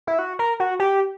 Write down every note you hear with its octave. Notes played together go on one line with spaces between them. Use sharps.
E4
F#4
A#4
F#4
G4